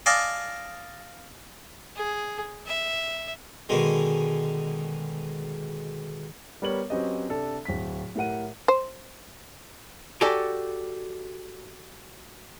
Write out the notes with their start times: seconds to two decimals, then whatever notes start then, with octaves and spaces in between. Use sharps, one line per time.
0.06 D5 D#5 F5 G#5 A5 D6
1.96 G#4
2.66 E5
3.69 B2 D3 D#3 G#3
6.62 G3 B3 A#4 C#5 F#7
6.90 F#3 C4 C#4 G4 B4 D#5
7.29 C3 D4 A4
7.65 D1 B6
8.15 A2 G4 A#4 F#5 D#7
8.68 C5
10.21 F#4 G4 A4 D5 G#5